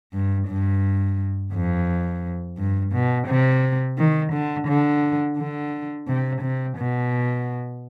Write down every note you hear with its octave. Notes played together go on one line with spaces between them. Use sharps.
G2
G2
F2
G2
B2
C3
D#3
D3
D3
D3
C3
C3
B2